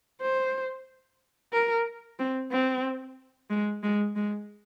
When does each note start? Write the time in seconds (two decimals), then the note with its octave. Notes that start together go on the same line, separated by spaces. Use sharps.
0.22 C5
1.53 A#4
2.19 C4
2.52 C4
3.51 G#3
3.83 G#3
4.16 G#3